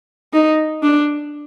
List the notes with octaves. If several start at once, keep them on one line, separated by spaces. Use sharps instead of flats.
D#4
D4